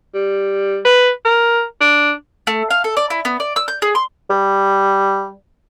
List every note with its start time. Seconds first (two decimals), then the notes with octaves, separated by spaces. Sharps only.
0.14 G3
0.85 B4
1.25 A#4
1.81 D4
2.47 A3
2.70 F5
2.84 A4
2.97 D5
3.10 E4
3.25 B3
3.40 D5
3.56 E6
3.68 G6
3.82 G#4
3.95 C6
4.30 G3